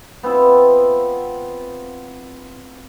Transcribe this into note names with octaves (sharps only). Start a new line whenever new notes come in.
B3 C4 F4 E5